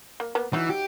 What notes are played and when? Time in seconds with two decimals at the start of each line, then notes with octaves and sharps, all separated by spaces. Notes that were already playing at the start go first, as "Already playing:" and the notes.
0.20 A#3
0.35 A#3 B3
0.53 E3 F#3 D#4
0.70 G4